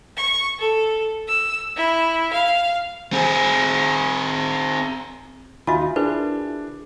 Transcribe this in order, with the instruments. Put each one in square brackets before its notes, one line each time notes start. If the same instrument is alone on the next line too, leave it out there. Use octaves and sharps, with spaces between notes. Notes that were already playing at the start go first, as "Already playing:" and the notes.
[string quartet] C#6
A4
E6
E4
F5
[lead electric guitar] C4 G#4
[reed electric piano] D#2 D#4 F5 [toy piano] F4 F#4 E5 [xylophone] G#5 A6
[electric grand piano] D4 [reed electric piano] E4 G#4 [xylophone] A#4 [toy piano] B4